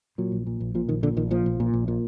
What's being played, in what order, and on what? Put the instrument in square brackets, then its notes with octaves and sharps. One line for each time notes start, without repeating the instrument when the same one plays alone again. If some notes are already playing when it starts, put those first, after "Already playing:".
[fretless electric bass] A#2 F#3
A#1
A#2
A#1
A#2 F3
A#1 D#3
A#2 D3
A#1 D#3
A#2 F3
A#1
A#2
A#1
A#2